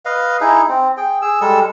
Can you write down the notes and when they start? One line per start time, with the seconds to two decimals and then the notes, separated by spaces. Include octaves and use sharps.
0.05 B4 D#5 F5
0.41 D#4 E4 G#4
0.69 C4
0.97 G#4 G5
1.22 G#4 E6
1.41 G3 G#3 A4 E6